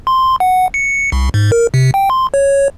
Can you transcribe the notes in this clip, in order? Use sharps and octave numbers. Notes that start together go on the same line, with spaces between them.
C6
F#5
C#7
C2
G#2
A#4
C3
G5
C6
C#5